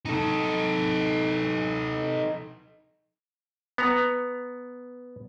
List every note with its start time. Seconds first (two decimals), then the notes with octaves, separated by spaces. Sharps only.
0.05 D#4 A4
3.78 B3 A#5